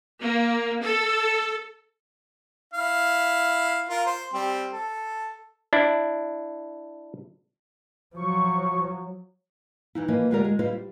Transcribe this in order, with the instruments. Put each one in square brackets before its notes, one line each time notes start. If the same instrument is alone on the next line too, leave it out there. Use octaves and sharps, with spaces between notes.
[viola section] A#3
A4
[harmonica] E4 F5
F4 A#4
C5
G3 C4
A4
[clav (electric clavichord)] D4 E4
[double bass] F3 F#3 [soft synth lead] C#6
[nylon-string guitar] E3 D#4 E4
E3 F3 A#3 B4 D#5
D2 G#3 F4 G4 A#4 D5
G#3
G3 E4 F4 B4 C5 D#5
G3